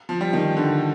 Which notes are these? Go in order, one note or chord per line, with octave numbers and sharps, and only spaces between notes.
F3
G3
D#3
D3